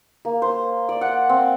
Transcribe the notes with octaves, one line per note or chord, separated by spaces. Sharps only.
A#3
C5
D5
F#5
C4